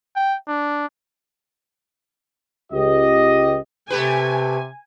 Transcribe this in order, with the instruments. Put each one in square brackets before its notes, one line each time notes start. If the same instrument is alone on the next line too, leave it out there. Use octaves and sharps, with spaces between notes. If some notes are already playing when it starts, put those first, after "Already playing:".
[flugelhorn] G5
D4
[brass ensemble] C#2 G4 D#5
[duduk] C3 [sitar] A3 G4 B4 [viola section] G#5